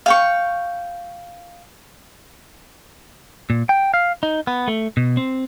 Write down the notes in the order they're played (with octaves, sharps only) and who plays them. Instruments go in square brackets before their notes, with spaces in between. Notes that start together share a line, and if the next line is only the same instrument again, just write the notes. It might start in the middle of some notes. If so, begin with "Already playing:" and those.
[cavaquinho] F5 G5 C#6
[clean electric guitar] A#2
G5
F5
D#4
B3
A3
B2
C4